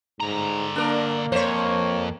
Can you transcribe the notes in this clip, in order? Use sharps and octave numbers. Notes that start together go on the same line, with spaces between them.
G#2 D3 A#5
A#3 D4 A#4
F2 C5 C#5